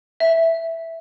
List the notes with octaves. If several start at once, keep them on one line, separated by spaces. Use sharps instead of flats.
E5